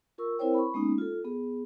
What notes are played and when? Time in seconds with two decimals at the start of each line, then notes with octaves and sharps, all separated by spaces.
0.18 F4 A#4 C#6 E6
0.39 C4 E4 A#4 C5 C#5 G5
0.54 B5 C#6
0.74 G#3 A#3 B3 C#4 D#4
0.98 F4 A4
1.25 B3 G#4